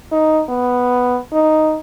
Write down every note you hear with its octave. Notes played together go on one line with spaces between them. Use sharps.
D#4
B3
D#4